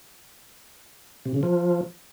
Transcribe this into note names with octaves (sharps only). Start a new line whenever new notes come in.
C3
C#3
F3